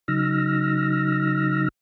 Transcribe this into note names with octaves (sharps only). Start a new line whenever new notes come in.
C#3 F#3 D#4 E6 F6 A#6